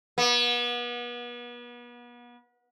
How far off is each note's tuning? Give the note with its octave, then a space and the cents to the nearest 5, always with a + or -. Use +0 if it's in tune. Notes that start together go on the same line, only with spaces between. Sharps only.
B3 -35